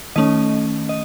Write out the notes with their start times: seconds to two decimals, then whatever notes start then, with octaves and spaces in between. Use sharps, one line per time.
0.16 D#3 A3 C#4 D#5
0.89 D#5